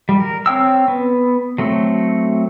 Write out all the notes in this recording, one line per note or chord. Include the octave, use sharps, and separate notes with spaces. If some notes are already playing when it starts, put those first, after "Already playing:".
G3
A#4
C4 C#5 G5 E6
B3
F#3 A3 C4